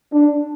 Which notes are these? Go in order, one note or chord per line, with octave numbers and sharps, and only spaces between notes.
D4